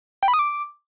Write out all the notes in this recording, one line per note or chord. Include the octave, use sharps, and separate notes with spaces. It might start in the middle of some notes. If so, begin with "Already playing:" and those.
G5
B5
D#6
D6